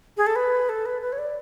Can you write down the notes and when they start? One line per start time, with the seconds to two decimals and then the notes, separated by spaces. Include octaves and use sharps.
0.17 G#4
0.27 A4
0.36 B4
0.69 A4
0.86 B4
1.02 B4
1.12 C#5
1.18 D5